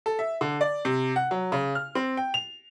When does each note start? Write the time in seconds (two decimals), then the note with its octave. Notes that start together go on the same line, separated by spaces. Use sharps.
0.06 A4
0.19 E5
0.41 D3
0.61 D5
0.85 C3
1.16 F#5
1.31 F#3
1.52 C#3
1.75 F6
1.95 C4
2.17 G5
2.34 F7